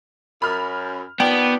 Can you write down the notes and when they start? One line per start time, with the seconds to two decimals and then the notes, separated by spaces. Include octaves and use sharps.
0.42 F#2 B5 F6
1.20 D#3 F3 B3 D5 G5 F#7